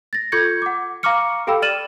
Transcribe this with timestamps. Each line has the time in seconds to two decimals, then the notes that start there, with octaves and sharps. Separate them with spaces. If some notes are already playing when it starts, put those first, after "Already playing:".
0.13 A6 A#6
0.32 F4 A4 C#6 G6 G#6 C#7
0.62 F#5 D6
1.03 F5 A#5 C#6 D6 F6 C#7
1.47 G4 A4 F5 G5 B5 E6
1.62 D5 F6 A6 D#7 E7 F#7